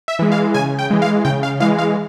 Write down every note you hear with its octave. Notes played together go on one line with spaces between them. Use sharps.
E5
E3 G#3
F5
C#3 G#5
G5
E3 G#3
F5
C#3 G5
F5
E3 G#3 F5
F5